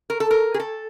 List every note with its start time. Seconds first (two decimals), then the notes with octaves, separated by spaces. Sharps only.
0.10 A#4
0.20 A4
0.31 A#4
0.54 G#4
0.60 A4